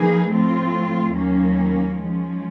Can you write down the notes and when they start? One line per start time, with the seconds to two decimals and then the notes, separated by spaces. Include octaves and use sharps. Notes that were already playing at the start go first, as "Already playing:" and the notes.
Already playing: F3 A#3 D#4 G#4 B4
0.29 A2 F3 A3 C4 F4
1.13 D#2 D#3 F#3 A#3 C#4
1.97 F3 G#3 C#4